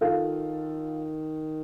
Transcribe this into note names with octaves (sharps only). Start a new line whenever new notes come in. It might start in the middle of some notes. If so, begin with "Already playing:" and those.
D#3 F4 A4